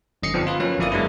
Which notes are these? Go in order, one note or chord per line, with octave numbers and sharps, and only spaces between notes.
G1 F#2 D#5 C7 C#7
D3 F3 B3 C4 D4 D#4
F4 B4
F3 F#3 A#3 C#4 B4
G1 F2 A#3 E4 D5 D#6
F#3 G#3 A#3 B3 D4 E4